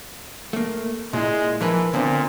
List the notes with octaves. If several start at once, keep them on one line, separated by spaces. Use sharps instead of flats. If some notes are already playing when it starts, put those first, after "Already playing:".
A3 A#3
A#2 G#3 E4
E3 F3 A#4 B4
A#2 D3 B3 C4